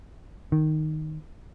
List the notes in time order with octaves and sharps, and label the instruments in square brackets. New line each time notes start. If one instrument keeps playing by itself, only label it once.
[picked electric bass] D#3